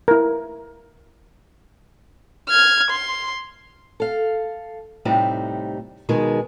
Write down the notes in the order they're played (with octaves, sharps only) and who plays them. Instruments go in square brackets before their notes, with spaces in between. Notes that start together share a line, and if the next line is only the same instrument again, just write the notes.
[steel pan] E4 A#4
[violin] F6 G#6
C6
[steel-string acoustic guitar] A4 F5
A2 C3 G3 C4 D#4
B2 D#3 G#3 G#4